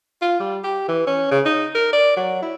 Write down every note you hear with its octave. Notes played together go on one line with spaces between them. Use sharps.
F4
G3
G4
E3
C#4
C#3
D#4
A#4
D5
F#3
E4